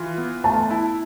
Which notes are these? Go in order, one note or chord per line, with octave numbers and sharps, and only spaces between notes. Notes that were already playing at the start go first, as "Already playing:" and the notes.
Already playing: E3 F4
B3
A3 A5
E4